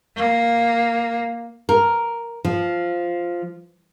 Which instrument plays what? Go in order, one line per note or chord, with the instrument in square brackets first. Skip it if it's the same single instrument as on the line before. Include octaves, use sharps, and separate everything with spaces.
[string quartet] A#3
[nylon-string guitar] A#4
F3